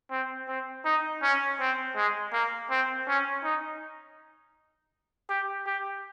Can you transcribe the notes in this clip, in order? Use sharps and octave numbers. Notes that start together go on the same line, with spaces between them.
C4
C4
D#4
C#4
C4
G#3
A#3
C4
C#4
D#4
G4
G4